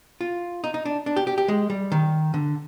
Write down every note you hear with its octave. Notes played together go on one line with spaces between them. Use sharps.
F4
D#4
D#4
D4
D4
G4
G4
G4
G#3
G3
D#3
D3